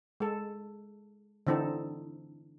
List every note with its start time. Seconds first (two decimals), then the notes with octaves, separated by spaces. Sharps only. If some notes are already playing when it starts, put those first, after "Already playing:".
0.20 G#3 A4
1.47 D3 E3 C4 D#4 A4